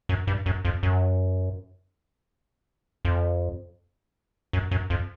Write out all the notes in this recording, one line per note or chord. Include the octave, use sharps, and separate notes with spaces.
F#2
G2
F#2
F2
F#2
F2
F#2
F#2
F2